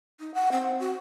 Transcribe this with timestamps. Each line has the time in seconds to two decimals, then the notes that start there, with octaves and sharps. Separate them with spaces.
0.20 D#4
0.34 F#5
0.52 C4
0.79 F#4